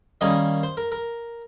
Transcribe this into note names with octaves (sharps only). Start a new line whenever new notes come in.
D#3 G3 A#3 C#4 D#5
C5
A#4
A#4